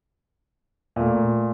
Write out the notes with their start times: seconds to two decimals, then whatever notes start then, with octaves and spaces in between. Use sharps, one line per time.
0.96 A#2 A3